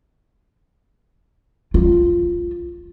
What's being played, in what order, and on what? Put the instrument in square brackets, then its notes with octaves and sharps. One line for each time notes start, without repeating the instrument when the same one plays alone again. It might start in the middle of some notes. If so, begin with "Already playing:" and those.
[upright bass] F4